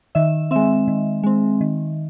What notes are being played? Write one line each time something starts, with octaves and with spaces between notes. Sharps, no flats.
D#3 E5
G#3 C4 E5
D#3
G#3 C4
D#3